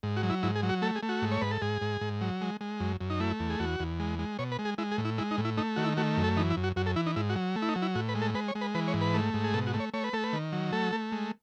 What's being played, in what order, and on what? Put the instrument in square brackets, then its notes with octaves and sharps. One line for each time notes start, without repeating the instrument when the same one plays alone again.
[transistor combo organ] G#2
F#4
F#3
E4
G#2 E4
G#4
F#3
F#4
A3 A4
G#4
A3
F#4
G#2
C#5
G#2 B4
A4
G#2 G#4
G#2
G#2
F#3
G#3
G#3
F#2
F#2
D#4
A3 E4
E2
G#4
E2 F#4
E2
G#3
G#3
B2 C#5
B4
G#3
G#4
G#3 E4
G#4
A2
E4
G#3 E4
D#4
A2
E4
A3 D#4
D#3 F#4
E4
A3 F#4
F#2
A4
E3 D#4
E4
F#2
F#4
F#2 F#4
A4
E3 E4
D#4
G#2 E4
F#4
F#3
A3
E4
D#4
F#3
E4
A2 F#4
B4
G#3
A4
G#3 B4
C#5
G#3
B4
E3 B4
C#5
G#2
B4
A3
G#2
G#4
B2 A4
F#4
A3
C#5
A3 C#5
B4
A3 A4
B4
D#3
F#3
A3 A4
A3
G#3